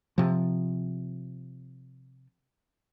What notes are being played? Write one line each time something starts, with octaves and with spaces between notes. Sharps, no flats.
C3 F3